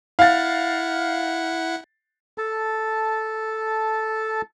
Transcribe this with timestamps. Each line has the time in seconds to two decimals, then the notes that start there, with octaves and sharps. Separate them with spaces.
0.19 E4 F5 F#5 A6
2.38 A4 A5